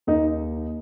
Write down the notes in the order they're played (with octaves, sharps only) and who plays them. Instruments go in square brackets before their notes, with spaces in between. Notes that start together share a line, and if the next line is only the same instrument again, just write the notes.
[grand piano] D#2 D#4